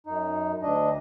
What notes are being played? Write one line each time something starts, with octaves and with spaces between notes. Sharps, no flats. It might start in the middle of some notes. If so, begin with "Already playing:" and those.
F#2 D#4
D2 D4 D#5